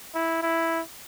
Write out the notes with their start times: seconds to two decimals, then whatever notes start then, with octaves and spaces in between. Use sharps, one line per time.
0.14 E4
0.42 E4